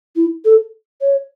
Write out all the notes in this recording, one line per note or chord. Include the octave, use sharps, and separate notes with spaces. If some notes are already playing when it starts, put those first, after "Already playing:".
E4
A4
C#5